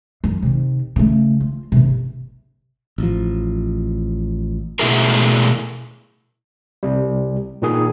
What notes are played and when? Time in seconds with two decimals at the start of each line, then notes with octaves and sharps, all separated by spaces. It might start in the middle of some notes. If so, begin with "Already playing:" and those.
0.24 F#2
0.42 C3 D#3
0.96 C#3 A3
1.41 F4
1.72 G1 C3
2.98 A1 F3
4.79 B2 A3 E4 G#4 A#4
6.83 C2 C3 G3
7.62 A#2 D#3 G#4